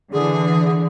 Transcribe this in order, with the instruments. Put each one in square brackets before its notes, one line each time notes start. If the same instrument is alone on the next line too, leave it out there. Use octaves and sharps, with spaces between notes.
[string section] D3 E3 [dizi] G#4